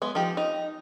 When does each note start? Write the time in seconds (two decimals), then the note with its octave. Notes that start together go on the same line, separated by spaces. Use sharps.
0.02 G#3 B3
0.15 F3 D#4 G4
0.37 D#4